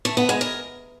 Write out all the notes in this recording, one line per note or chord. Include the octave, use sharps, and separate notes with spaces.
A3
B3
G#3
A#4